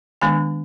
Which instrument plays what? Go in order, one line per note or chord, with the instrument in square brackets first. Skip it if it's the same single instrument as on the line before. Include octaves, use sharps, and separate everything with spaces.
[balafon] D#3 G#3 B3 D4 G#5